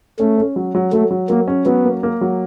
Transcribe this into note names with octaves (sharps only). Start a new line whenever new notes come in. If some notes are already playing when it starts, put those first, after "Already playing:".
A3 C#4
C#4
F#3
F#3
F#3 A3
F#3
F#3 A#3
C#4
F#3 B3
A#3
A#3
F#3